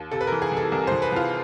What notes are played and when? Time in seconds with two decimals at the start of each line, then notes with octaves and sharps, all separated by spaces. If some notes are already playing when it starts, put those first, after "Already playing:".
Already playing: D#2
0.11 C3 A4
0.21 B4
0.27 E3 A#4
0.42 G#4
0.51 C2
0.57 A4
0.72 C2 A#4
0.87 C2 C5
1.02 B4
1.12 C2 F4